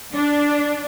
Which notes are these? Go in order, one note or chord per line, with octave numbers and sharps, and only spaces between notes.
D4